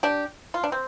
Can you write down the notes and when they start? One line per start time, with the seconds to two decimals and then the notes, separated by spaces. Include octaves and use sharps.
0.03 D4 G4
0.54 F4
0.64 D4
0.72 C4